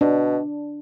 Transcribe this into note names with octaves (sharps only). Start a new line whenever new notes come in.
B2 D4